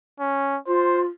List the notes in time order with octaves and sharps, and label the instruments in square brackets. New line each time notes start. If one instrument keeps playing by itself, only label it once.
[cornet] C#4
[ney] F4 [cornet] C5